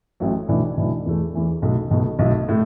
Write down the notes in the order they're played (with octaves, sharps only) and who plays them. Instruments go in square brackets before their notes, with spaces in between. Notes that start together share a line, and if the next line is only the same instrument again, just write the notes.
[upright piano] A1 A2 F#3 A3
B1 A2 E3 D4
B1 A2 E3 D4
E2 E3 A3
E2 E3 A3
B1 B2 A3
B1 B2 A3
B1 A2 A3
A2 A3